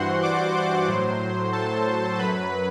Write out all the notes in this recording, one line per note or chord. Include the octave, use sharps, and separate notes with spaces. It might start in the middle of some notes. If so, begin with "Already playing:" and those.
Already playing: G2 E3 F#4 C5 F#5 C6
D5 D6
C5 C6
A2 F#3
A4 A5
F#2 F#3 B4 B5